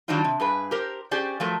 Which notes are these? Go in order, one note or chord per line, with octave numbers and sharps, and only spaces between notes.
D#3 F#3 G3 D4 D#4 F4
C3
G2 G#4 B4
G4 A#4 C5
C#4 G4 G#4 C5 D5
F3 F#3 A3 A#4